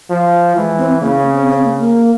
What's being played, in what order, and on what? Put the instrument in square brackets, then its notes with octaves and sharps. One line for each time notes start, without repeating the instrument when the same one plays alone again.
[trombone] F3
[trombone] E3 [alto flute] G#3
[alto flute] C4
[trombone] C#3 [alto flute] A#3
[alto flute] C#4
C4
C4
A#3
A#3